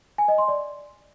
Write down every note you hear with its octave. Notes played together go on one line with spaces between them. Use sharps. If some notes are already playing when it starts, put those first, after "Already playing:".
G#5
D#5
C6
D5